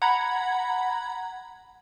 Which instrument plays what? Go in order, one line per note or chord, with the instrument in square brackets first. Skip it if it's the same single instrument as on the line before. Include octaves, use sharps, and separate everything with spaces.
[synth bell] F#5 A#5 B5 G#6